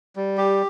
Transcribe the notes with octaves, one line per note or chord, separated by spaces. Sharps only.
G3
G4